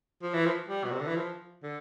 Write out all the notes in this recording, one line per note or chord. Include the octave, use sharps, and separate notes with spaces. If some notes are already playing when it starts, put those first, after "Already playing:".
F3
E3
F3
G3
B2
C3
D3
E3
F3
D3